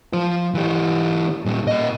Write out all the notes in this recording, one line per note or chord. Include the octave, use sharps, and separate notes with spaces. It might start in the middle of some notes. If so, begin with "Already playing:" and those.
F3 C5
E3 G4
A#2 G3
A#2 D#5